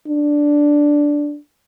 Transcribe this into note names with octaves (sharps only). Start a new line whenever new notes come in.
D4